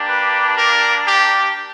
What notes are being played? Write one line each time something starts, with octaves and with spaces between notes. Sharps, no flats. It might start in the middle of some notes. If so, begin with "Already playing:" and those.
Already playing: A#3 D4 G4
B4
A#4
G4